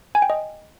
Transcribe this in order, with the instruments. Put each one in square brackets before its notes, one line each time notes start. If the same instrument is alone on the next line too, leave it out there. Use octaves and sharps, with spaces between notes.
[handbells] G#5
G5
D#5